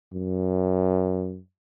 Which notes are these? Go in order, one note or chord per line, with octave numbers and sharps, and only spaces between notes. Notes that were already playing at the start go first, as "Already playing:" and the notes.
F#2